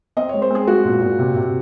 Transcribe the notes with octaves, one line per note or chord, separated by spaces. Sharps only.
C4 D#5
G#3 C#5
C5
C4 G#4
G#3 F#4
A#2
A#2
C3
C3